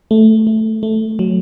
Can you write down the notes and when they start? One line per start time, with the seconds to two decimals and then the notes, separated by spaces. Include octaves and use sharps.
0.11 A3
0.47 A3
0.83 A3
1.19 F#3